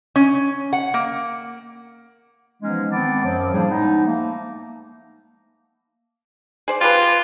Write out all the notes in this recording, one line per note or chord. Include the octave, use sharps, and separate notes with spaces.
C#4
F#5
A#3
E3 F3 G#3 B3 C#4 D#4
D#3 G#3 B3 C4 A5 D6
F#2 F3 F#3
A2 F3 G3 A#3 D4 G#4
F3 G#3 B3 D#4
A3 A#3
G#4 C5 D5
F4 G4 G#4 B4